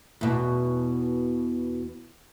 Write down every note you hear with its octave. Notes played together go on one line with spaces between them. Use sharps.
E2 B2